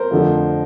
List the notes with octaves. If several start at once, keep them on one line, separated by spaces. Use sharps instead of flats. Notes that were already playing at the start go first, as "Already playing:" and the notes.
Already playing: A#4 C5
F2 D3 F3 A3